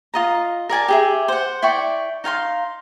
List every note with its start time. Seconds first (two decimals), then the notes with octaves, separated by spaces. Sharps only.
0.14 F4 D#5 A#5
0.69 A#4 D5 G#5 A5
0.88 G4 G#4 E5
1.28 C5 F#5
1.62 E4 D5 G5 C#6
2.24 D#4 F5 G#5 C6